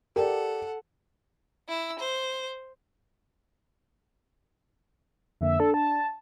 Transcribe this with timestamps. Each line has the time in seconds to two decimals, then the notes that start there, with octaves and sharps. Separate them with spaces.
0.16 G4 A4 A#4 D5 F#5
1.68 E4 E6
1.99 C5
5.41 F2 D3 A#3 E5
5.60 D4 A4
5.74 A5